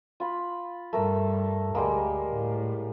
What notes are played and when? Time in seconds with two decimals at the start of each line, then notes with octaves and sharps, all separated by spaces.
0.20 F4 B5
0.93 G2 G3 A3 A#4 E6
1.75 D2 G3 G#3 A#3
2.31 A2